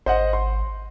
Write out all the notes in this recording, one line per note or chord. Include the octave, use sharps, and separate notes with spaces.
G#1 C5 D#5 F#5
C6